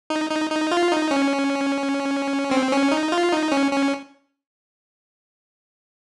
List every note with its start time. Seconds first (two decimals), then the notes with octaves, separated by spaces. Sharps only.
0.10 D#4
0.30 D#4
0.50 D#4
0.71 F4
0.91 D#4
1.11 C#4
2.51 C4
2.72 C#4
2.92 D#4
3.12 F4
3.31 D#4
3.52 C#4
3.71 C#4